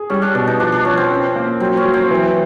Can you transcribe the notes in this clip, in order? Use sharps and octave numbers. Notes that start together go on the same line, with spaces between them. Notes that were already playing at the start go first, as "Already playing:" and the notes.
Already playing: G#4
G3 C#4
D4
B2 D4
D#4
F3 D4
D4
F3 C#4
C4
C#4
A#3
F#3 C4
C#4
F#3
C4
E3